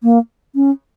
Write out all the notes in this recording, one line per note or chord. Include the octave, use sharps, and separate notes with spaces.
A#3
C#4